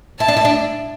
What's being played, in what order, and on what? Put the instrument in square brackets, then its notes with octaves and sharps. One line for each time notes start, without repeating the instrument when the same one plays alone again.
[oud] E4 [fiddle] A5
[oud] D4
E4
D4